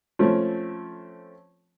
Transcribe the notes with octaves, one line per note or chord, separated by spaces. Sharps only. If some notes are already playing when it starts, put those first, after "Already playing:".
F3 A3 C4 C#4